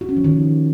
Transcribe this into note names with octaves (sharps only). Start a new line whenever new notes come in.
F#4
C#4
F3
D#3